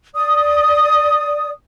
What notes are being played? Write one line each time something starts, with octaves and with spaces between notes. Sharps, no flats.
D5 D#6